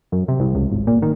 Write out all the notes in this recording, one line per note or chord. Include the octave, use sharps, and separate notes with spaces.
F#2
C3
C2
C#2
G#1
A#2
D#3